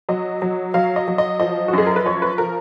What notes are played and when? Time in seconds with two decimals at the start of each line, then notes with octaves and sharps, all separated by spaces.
0.09 F#3 D#5
0.42 F#3
0.74 F#3 F5
0.96 D#5
1.08 F#3
1.18 D#5
1.40 F3 D#5
1.68 F#4
1.73 F#2 G#4
1.87 A#4
1.96 B4
2.06 F3 C#5
2.22 B4
2.38 F3 A#4